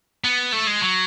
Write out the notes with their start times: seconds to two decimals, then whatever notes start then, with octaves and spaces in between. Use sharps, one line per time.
0.24 B3
0.52 A3
0.67 G#3
0.81 F#3